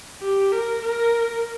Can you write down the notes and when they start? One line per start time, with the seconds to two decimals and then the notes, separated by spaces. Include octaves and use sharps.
0.22 G4
0.52 A#4
0.82 A#4